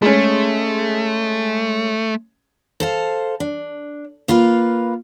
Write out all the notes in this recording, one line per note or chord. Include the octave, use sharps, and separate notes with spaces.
G#3 A3 C#4
A4 C5 F5
D4
A#3 F4 B4 F5